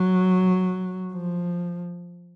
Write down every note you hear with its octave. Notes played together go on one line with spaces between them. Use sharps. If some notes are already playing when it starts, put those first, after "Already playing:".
Already playing: F#3
F3